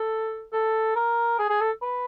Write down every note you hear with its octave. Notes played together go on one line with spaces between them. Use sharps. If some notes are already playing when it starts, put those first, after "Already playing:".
Already playing: A4
A4
A#4
G#4
G#4
A4
B4